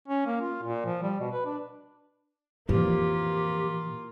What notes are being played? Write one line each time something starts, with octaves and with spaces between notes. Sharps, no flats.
C#4
A#3
F4
A#2
F3
G3
B2
B4
D4
F2 A#2 E3 F3 A#3 F4 G4